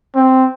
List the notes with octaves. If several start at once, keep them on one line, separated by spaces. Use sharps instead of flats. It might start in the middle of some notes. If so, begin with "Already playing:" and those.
C4